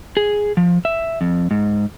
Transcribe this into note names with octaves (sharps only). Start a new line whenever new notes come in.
G#4
F3
E5
F2
G#2